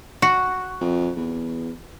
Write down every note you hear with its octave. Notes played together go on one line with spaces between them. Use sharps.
F#4
F2
E2